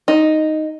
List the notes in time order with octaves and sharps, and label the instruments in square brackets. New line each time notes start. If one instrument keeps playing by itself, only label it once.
[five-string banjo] D#4